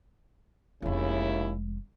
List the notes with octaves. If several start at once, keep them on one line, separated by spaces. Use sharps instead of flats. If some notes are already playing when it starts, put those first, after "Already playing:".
F1 D#2 C#3 G#3 E4